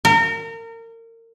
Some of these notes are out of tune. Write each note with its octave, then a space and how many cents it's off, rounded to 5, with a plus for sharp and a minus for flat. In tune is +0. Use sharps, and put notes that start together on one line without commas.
A#4 -30